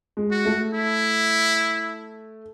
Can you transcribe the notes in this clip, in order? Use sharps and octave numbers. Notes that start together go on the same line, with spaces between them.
G#3
F#4
A3
E4